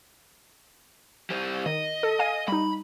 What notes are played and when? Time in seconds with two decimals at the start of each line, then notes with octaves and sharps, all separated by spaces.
1.30 G3 C5
1.66 D#3 D#5
2.03 A4
2.19 F5 G#5 D#7
2.48 G3 D#4 B5